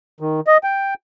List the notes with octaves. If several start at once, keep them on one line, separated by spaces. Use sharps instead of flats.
D#3
D#5
G5